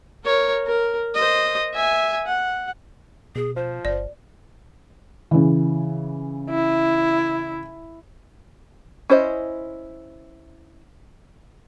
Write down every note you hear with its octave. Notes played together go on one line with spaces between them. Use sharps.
A#4 C#5
A#4
C5 D#5
E5 G#5
F#5
B2 G#4
F3 C5
G1 D5
C#3 E3
E4
C#4 E4 C5 C#5 D#5